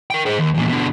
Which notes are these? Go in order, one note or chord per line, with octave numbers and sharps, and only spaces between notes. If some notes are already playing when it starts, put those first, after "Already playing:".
A#4 G5
G#4 C5
D#2
E2 A#2
B2 D3